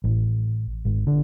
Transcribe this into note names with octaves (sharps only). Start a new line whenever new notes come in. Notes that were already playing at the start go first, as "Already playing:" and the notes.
A1
G#1
D3